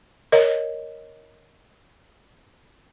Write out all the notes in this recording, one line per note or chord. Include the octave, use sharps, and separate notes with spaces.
A#4 C#5 D#5